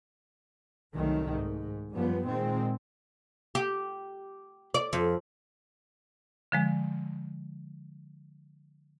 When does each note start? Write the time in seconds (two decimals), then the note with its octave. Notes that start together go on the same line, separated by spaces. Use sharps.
0.93 C2 F#2 D#3 A3
1.33 G#2
1.93 F#2 F3 G3 B3
2.25 A#2 D#3 G#3 C4
3.55 G4
4.74 D5
4.93 F2
6.52 D3 F3 G#3